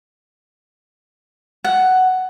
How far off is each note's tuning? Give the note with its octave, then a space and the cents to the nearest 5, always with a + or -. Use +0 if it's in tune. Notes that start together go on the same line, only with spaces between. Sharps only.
F#5 +10